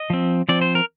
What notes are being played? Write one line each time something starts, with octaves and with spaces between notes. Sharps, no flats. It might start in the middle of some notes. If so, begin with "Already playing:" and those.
Already playing: D#5
F3 C4
F3 C4 D5
C5
A#4